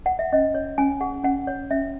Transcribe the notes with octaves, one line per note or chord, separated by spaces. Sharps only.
F#5
E5
C#4 D#5
C#5
C#4 G#5
G#4 F#5
C#4 F#5
C#5
C#4 E5